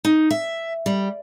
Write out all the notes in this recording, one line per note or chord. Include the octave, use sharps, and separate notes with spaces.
D#4
E5
G3